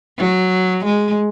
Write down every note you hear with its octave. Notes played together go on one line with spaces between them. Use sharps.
F#3
G#3